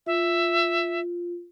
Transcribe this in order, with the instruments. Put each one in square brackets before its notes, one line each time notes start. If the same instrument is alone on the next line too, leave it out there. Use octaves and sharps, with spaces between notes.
[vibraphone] F4 [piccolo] E5